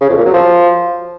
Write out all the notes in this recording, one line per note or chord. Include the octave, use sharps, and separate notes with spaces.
C#3
F2
A#2
F#3
F3